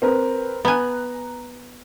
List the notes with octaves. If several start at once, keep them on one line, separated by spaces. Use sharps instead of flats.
C4 A#4 B4
B3 G#5 A#5 F#6